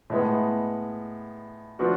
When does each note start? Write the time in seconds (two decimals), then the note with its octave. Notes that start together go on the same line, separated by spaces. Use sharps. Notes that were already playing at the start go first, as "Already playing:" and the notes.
0.10 A2 G#3 B3
1.79 F3 B3 D4 F#4